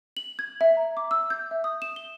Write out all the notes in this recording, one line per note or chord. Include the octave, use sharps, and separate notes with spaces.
F#7
G#6
E5
A#5
D6
E6
G6
E5
D#6
E7
G7